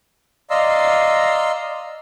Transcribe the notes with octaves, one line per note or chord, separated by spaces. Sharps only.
D5 D#5 F5 A#5 C6 E6